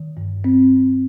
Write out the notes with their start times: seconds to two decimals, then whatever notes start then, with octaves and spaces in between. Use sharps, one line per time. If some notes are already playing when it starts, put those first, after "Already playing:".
Already playing: D#3
0.17 G2
0.44 C4